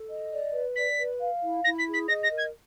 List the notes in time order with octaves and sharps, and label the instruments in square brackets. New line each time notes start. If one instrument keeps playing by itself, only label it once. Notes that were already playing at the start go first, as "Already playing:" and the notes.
Already playing: [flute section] A4
D#5
D5
B4
[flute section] D5 [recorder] B6
[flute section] B4
F5
E4
[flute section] E4 [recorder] A#6
[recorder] B6
[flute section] G#4
[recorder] B6
[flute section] D#5 [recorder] A#6
[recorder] A#6
[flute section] A#4
[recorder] G#6